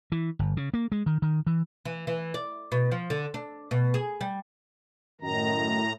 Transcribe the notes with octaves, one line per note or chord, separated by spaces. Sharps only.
E3
G1
C#3
A#3
G#3
D#3
D#3
E3
E3
E3
D5
B2
F3
D3
D4
B2
G#4
G3
F#2 A2 D#3 A#5